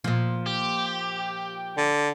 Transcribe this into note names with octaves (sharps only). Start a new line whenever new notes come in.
A#2 F3
G4
D3